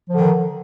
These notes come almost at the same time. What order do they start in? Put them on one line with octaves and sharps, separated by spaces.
F3 D3 D#3